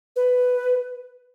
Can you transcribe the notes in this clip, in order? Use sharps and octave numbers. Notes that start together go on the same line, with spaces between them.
B4